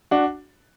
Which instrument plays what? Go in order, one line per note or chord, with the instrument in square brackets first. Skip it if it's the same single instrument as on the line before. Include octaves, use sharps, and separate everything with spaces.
[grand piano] D4 F#4